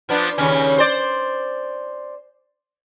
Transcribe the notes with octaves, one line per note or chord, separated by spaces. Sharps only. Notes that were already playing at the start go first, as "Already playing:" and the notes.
F3 B3 D4
D#2 C#3 C#4
C5 D5